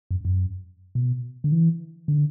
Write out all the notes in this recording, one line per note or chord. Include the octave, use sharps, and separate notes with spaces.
F#2
F#2
B2
D3
E3
D3